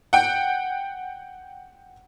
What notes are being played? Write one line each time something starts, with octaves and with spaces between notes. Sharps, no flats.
F#5 G5